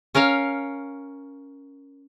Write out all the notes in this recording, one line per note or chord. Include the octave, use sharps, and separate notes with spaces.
C#4 A#4 C#5 F5